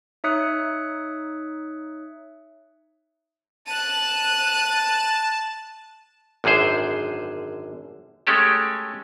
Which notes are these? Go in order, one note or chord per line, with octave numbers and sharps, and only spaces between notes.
D#4 C#5 E5 D#6 F#6 C#7
A5 F#6 D#7
G#1 F#2 D3 G#4 C5
G#3 A3 C#4 G4 A4